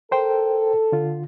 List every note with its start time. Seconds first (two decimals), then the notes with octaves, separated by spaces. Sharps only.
0.11 A4 A#4 C5 G5
0.92 D3 F4